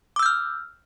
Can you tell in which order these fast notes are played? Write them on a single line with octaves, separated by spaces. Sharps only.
D6 E6 G6 F6